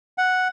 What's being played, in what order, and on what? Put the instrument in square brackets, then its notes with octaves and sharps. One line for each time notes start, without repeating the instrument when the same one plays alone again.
[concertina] F#5